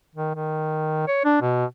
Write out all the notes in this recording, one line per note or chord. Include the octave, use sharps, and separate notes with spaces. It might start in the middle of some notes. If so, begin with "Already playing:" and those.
D#3
D#3
C#5
D4
B2